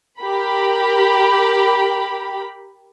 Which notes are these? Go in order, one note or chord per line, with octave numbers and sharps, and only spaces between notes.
G4 A#4 B5